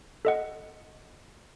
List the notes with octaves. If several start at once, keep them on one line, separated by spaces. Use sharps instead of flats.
A4 D#5 F#5